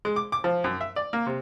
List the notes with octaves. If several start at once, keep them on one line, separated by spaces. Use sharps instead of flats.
G#3
D6
D6
F3
F#2
E5
D5
A#3
C3